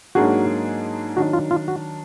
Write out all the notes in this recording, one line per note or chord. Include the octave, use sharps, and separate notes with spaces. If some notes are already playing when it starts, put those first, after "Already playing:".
G#2 F#3 A#3 D4 F#4 G#4
D#3 F#3 D4 F#4
F4
F4
F#4